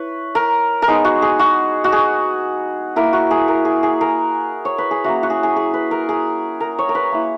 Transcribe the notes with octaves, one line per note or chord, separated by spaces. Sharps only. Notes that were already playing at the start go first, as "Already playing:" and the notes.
Already playing: E4 B4 C#5
A#4
A#4
G#3 B3 D#4 G#4
F#4
G#4
F#4
F#4
G#4
A#3 E4 A#4
F#4
G#4
A#4
G#4
G#4
A#4
C#5
B4
G#4
F#3 A#3 C#4 E4 F#4
F#4
G#4
G#4
G#4
B4
A#4
G#4
A#4
C#5
A#4
B4
A#3 E4